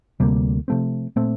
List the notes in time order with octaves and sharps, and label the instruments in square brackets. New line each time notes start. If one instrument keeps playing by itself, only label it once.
[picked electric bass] D2 C3 G3 A#3
C3 F3 A3 C4
A#2 A3 C4